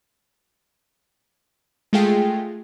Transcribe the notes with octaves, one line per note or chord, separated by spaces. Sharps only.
G#3 A3 F4 G#4 G5